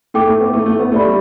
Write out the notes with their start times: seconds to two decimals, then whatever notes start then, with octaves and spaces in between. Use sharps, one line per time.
0.14 A3 A4 G5 D6
0.27 A3
0.40 B3
0.53 A3
0.66 A3
0.79 B3
0.92 A3 G4 D5 B5
1.04 G3